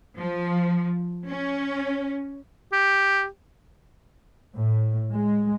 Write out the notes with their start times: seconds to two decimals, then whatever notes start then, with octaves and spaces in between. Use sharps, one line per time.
0.17 F3
1.29 C#4
2.72 G4
4.55 A2
5.13 G#3